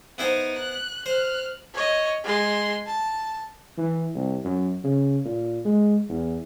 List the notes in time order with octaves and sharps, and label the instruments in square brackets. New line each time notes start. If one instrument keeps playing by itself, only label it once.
[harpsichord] B3 E4 C5 [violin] D#4
[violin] F#6
[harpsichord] C5 [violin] F6 F#6
[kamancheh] C#5 D#5
G#3 C6
A5
[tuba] E3
C2
F#2
C#3
A#2
G#3
E2